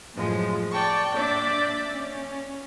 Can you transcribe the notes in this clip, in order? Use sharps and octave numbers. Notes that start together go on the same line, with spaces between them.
F#2 A2 F3 G#3
D5 G5 A5 C#6
A#3 D4 D5 E5 D6 G6
C#4